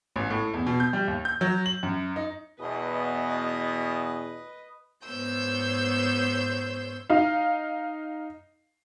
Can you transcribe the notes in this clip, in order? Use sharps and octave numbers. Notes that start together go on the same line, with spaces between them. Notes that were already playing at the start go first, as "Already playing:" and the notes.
A1
A2
E2
B2
G6
G3
D#2
G6
F#3
F#7
F#2
D#4
E2 B2 B4 D#5
G#2 B3 C5 C#5 E6 G6
D#4 F5